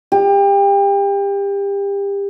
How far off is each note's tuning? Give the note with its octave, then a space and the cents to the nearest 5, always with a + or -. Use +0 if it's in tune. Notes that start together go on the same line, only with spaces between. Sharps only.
G4 +30